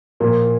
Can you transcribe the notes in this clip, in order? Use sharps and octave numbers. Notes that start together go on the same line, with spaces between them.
A#2 F3 A#3